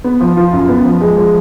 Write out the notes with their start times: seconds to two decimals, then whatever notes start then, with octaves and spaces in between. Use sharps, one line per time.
0.04 B3
0.20 F3
0.37 F4
0.53 F#2
0.69 B3
0.85 F3
1.01 G#3
1.17 F3